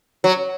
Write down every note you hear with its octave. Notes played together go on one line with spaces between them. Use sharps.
F#3